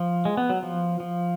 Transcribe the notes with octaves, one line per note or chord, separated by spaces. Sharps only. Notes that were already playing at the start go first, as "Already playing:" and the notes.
Already playing: F3
G#3
B3
F#3
F3
F3